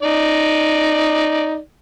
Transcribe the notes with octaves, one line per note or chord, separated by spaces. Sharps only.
D#4 D5